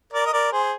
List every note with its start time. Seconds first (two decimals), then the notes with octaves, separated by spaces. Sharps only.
0.13 A#4 D5
0.27 D#5
0.33 A#4 D5
0.52 G#4 C5